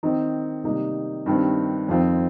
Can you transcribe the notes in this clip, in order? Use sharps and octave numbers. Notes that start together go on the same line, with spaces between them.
D#3 C4 D#4
C3 D#3 G3 A#3 D#4
G2 D#3 C4
F2 D#3 C4 F4